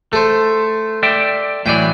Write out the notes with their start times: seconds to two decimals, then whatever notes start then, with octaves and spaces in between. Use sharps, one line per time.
0.13 A3 A4 C5
1.03 D5 E5 G5
1.66 A2 E3 F#3 D5 G5